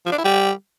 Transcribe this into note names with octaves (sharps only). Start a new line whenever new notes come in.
F3
D4
E4
G3